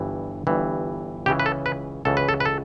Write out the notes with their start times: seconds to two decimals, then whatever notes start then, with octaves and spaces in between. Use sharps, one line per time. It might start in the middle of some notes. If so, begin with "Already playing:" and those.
Already playing: G1 G2 E3
0.47 G1 G2 E3
1.26 C#2 C#3 E3 G4
1.39 B4
1.46 A4
1.66 B4
2.05 C#2 C#3 E3 A4
2.17 B4
2.29 A4
2.40 B4
2.45 A4